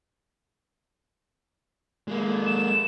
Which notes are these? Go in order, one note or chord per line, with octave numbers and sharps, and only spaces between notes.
G#3 A#3
E7